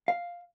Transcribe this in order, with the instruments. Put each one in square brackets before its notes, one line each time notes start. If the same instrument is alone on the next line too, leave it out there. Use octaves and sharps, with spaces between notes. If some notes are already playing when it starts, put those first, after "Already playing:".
[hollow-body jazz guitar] F5